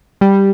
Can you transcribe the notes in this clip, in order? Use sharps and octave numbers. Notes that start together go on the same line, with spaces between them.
G3